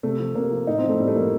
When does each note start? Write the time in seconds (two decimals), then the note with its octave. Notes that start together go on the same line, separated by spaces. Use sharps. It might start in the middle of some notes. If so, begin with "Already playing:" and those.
0.03 C3 A3
0.19 F3
0.35 C3 A#3
0.51 F3
0.67 A2 D#4
0.78 C4
0.84 F3
0.89 A3
1.00 A2 G3
1.08 A3
1.16 F3 A#3